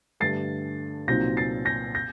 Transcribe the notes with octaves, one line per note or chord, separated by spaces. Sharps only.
G2 D3 A3 A6 C7
C2 A#2 F#3 C4 D#4 G6 A#6
A6 C7
G6 A#6
G6 A#6